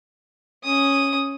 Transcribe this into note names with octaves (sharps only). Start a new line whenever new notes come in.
C#4 D#6